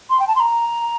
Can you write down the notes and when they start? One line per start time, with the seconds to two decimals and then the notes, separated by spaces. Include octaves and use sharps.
0.10 C6
0.20 G5
0.28 A5
0.36 C6
0.40 A#5